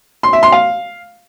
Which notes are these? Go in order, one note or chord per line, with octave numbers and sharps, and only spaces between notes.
C6
E5
C6
F5